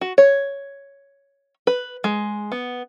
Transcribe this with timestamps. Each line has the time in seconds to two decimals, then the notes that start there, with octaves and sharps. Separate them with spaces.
0.01 F#4
0.18 C#5
1.67 B4
2.04 G#3
2.52 B3